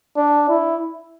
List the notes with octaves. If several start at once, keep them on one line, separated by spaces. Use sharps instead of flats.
D4
E4